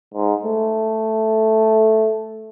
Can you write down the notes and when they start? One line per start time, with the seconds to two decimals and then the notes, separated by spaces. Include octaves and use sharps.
0.14 G#2
0.44 A3